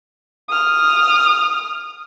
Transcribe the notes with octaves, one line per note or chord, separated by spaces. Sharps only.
D#6 F6